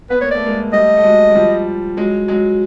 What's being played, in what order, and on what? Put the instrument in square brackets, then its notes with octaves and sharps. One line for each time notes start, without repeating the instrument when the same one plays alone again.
[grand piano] B3 [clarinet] B4
[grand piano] A#3 [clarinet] C#5
[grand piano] A3 [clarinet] D5
[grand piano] G#3 A#3
[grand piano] G3 A3 [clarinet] D#5
[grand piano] A3
F#3 G#3
G#3
F3 G3
F#3 G#3
F#3 G#3